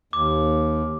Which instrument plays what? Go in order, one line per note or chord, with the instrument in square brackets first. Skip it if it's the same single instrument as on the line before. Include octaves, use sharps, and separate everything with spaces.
[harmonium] D#2 [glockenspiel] D6